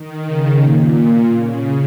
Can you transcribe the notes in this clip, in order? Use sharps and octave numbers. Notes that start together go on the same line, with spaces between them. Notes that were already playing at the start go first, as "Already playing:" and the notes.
Already playing: D#3
C#3
A#2
C#3